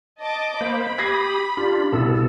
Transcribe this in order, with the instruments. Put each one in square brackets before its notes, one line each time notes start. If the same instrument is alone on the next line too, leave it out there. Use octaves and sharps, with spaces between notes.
[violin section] D#5 A5 D6
[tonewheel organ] A#3 C5 [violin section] B5
[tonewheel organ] G4 D#6 [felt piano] G#6 A#6 C7
[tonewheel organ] D4 F4 [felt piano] G4
[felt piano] C2 [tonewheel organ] B2 A4